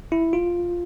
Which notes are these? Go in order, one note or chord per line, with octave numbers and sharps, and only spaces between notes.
E4
F4